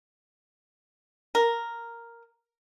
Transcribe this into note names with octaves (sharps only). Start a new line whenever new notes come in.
A#4